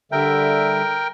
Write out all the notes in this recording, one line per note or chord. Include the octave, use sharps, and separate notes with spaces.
D3 G3 A#4 E5 G5